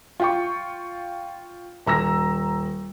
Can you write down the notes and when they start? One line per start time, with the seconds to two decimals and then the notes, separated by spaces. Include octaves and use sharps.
0.20 F4 G5 C#6
1.86 D#1 A#5 E6 A#6